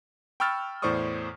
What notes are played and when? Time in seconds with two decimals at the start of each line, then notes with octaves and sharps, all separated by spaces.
0.40 G5 B5 C#6 E6 F6 A6
0.82 E2 A2 C5 D5 C#6 D#6